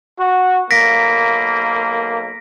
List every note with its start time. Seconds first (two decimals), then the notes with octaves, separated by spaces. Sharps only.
0.19 F#4
0.71 B1 A#3 A#6 B6 D7